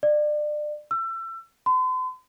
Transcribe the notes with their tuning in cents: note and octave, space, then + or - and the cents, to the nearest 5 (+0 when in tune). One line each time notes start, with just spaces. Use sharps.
D5 +30
E6 +30
C6 -45